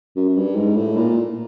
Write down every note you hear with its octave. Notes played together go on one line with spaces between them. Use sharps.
F#2
F#2
G2
G#2
A2
A#2